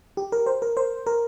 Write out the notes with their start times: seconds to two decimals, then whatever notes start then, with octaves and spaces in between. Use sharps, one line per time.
0.17 G4
0.32 A#4
0.46 C5
0.62 A#4
0.77 C5
1.07 A#4